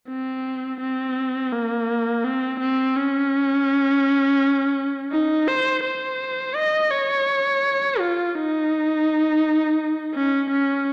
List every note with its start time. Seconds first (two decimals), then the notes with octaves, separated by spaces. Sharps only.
0.09 C4
0.81 C4
1.53 A#3
2.24 C4
2.60 C4
2.96 C#4
5.12 D#4
5.47 C5
5.83 C5
6.56 D#5
6.91 C#5
7.99 F4
8.35 D#4
10.15 C#4
10.50 C#4